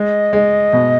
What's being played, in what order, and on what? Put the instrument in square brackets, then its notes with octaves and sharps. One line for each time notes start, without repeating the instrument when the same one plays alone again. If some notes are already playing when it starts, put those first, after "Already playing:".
Already playing: [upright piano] G#3 [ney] D#5
[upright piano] G#3
B2